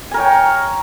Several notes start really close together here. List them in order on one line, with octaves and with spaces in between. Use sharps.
G#5 A#4 C#5 G5